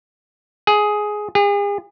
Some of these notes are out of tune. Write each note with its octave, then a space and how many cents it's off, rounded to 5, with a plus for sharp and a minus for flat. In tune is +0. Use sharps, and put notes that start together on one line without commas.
G#4 +10
G#4 -40